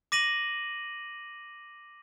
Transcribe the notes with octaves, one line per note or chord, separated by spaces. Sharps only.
D6 A#6 D#7 F#7